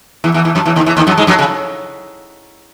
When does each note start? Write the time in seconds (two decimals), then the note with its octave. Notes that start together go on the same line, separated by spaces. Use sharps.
0.24 E2 E3
0.34 E2 E3
0.45 E2 E3
0.55 F#2 F#3
0.65 E2 E3
0.76 D#2 D#3
0.86 E2 E3
0.97 D#2 D#3
1.07 F#2 F#3
1.18 G#2 G#3
1.27 F#2 F#3
1.39 C#3